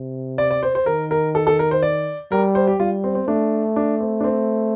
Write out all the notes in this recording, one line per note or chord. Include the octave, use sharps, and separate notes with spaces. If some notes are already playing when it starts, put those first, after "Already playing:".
Already playing: C3
D5
D5
C5
C5
D#3 A#4
A#4
A4
A4
A#4
C5
D5
G3 A#4
C5
G4
G3 F4
C4
C4
A3 D4
D4
C4
D4
C4